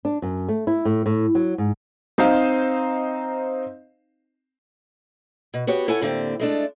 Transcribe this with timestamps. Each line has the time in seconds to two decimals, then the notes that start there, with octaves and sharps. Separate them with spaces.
0.05 D4
0.22 F#2
0.49 A3
0.67 E4
0.85 A2
1.06 A2
1.35 F#3
1.58 G#2
2.18 C4 D#4 C5 D#5 F5
5.54 B2
5.67 B3 F#4 G4 C#5
5.88 E4 A4 C#5 F#5 G#5
6.01 A2 D3 A#3 C4 G4
6.40 G#3 A3 D4